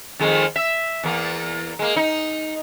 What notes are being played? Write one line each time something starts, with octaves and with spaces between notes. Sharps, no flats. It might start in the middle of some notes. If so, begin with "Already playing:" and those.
F2 D#3 G#3
E5
E2 A#3
G#3 A#3
D#4